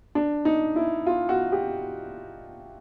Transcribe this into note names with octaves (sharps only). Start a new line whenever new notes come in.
D4
D#4
E4
F4
F#4
G4